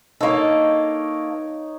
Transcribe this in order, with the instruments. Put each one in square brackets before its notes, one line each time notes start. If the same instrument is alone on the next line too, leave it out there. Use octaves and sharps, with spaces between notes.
[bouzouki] A#3 A4 [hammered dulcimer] D#4 C#5 D#5